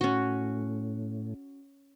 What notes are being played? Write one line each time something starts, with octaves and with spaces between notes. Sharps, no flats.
A2 C#4 F#4